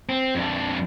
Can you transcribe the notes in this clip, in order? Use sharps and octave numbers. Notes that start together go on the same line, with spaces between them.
C4
F2 D4